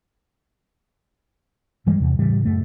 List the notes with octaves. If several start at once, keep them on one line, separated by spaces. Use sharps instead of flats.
G2 E3 G3 G#3
E2 C3
A2 C#3 E3 G3
F#2 A3